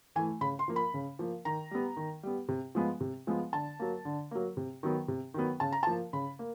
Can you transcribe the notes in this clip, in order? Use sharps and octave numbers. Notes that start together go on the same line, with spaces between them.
E3 A3 G#5
C#3 B5
C6
F3 A#3
B5
C#3
F3 A#3
D#3 A#5
G3 B3
D#3
G3 B3
C3
F3 G#3 B3
C3
F3 G#3 B3
D3 A5
F#3 A#3
D3
F#3 A#3
C3
D#3 F#3 B3
C3
D#3 F#3 B3
C#3 A5
A#5
A5
F3 A#3
C#3 B5
A#3